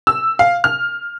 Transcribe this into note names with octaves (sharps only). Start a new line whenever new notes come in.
E6
F5
F6